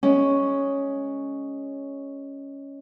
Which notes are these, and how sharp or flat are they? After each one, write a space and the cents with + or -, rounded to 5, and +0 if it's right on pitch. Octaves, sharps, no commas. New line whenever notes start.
G#3 +0 C#4 +0